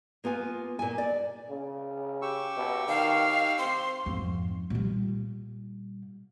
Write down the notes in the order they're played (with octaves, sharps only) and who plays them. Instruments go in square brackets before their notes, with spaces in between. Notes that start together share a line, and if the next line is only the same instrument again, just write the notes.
[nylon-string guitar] A#3 B3 F4 G#5
A#2 G#5
D5
[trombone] C#3
[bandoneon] G4 C#6 E6
[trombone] B2
[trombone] D#3 [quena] F5
[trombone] C4 [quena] C6
[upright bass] F2 G#2
A#2 G3